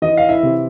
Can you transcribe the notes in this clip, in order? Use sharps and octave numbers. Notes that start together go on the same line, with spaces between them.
E3 D#5
F5
E4 E5
C3